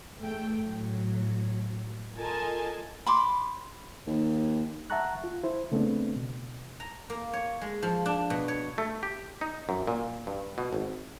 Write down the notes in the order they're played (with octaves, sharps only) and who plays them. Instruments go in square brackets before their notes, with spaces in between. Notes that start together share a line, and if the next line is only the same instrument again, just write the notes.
[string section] E2 A3 G5
A2 F#3
F4 A4 A#4 D#5 G#5 A5
[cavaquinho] B5 C6 D6
[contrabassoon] D#2
[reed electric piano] E5 F#5 A5 A#5 C#6 F#6
F4
E4 C5
C#3 A3 B3 C4 D4
B2
[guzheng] A#5
A#3
C#5
G#3
F3
D4
B2
C#5
[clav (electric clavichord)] A3
G4
D#4
F#2
A#2
G2
B2
G#1